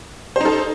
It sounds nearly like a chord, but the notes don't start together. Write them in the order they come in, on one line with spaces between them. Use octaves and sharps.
C5 D#4 A4